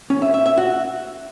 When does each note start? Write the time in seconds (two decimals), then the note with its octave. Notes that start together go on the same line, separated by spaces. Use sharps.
0.10 C#4
0.22 E5
0.34 E5
0.46 E5
0.58 F#4